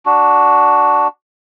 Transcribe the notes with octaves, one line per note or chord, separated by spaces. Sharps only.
D4 F#4